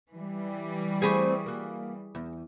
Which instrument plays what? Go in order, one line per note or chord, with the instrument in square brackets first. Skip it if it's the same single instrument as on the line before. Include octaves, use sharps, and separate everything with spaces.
[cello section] E3 G3
[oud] A3 C4 D5 [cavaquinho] G#4 B5 C#6
[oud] A#3 F#4
E2